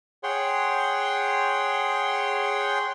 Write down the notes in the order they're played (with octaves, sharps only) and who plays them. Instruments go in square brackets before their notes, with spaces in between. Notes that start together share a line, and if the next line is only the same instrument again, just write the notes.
[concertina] G#4 C#5 F#5 G5 C6